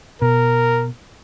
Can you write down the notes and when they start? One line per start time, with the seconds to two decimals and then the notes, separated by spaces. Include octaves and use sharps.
0.22 B2 A#4